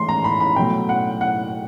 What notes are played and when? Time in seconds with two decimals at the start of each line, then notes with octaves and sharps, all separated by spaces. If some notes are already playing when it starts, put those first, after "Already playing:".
Already playing: G#2 E3 A3 C6
0.09 A#5
0.24 B5
0.40 B5
0.56 B2 F#3 A3 G5
0.89 F#5
1.21 F#5